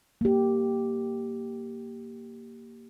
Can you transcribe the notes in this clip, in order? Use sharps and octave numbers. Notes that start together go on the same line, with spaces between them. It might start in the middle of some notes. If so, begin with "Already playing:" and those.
A#3 G4